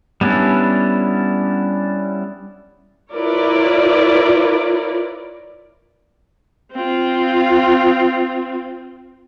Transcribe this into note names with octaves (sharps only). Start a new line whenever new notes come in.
G3 B3 C#4 D4 E4
E4 F4 A#4 B4 C#5 D5
C4 F4